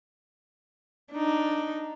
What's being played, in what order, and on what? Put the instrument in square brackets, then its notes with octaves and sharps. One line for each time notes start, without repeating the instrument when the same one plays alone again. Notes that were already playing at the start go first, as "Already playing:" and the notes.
[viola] D4 D#4